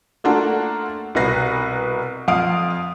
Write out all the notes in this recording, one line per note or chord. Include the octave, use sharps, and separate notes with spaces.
A3 A#3 D4 F4 F#4 A4
C2 B2 B4 A#6 C7
F2 F5 D#6 D7